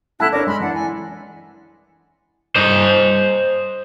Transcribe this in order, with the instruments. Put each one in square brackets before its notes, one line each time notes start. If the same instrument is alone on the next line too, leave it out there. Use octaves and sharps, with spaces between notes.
[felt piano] A3 F#5 A5 [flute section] E4 F#6
[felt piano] D4 D5 [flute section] A#4 C#5 D6
[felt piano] G#3 [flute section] B5 C6
[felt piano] E3 [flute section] D4 F#5
[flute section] G#5
[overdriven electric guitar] C5 D#5